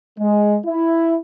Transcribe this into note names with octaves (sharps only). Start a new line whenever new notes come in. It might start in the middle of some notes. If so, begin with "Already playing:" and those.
G#3
E4